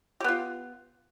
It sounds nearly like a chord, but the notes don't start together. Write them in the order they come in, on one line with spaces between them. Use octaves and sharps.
G4 B3 F4